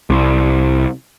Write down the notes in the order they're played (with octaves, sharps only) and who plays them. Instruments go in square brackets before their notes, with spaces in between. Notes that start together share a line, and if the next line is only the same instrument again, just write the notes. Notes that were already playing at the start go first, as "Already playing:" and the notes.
[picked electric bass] C2